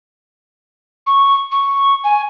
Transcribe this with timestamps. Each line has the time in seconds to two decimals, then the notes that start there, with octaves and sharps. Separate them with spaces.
1.07 C#6
1.52 C#6
2.04 G#5